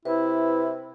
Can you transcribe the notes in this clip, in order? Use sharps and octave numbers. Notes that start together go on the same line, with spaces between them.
C3 E4 B4